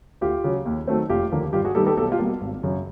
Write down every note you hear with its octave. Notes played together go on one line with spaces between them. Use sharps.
D2 F4 G4
C#3 F#3
D#2
D#3 F#3 A3 C4
F1 F4 G4
D#2 D3 F3 A#3
G2 F4 G4
F#4 G#4
D#3 G3 B3 G4 A4
G4 A4
B1 G4 A4
F4 G4
B2 G3 A#3
G#1
F#2 C#3